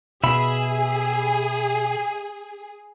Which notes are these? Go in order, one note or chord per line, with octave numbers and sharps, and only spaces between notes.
B2 G#4 E5 B5